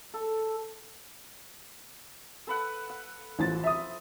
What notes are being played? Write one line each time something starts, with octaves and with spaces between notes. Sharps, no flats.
A4
A4 B4 F#5
F#5
A1 F3 A6
E5 D#6